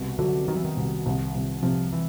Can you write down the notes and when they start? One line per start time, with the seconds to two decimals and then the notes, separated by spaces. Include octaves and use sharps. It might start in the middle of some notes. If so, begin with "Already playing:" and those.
Already playing: C2 B2
0.19 D3 F#3
0.47 D#3 F#3
0.56 E3
0.65 D#3
0.77 C2
1.06 C2
1.35 C2
1.63 C3 F3
1.92 E3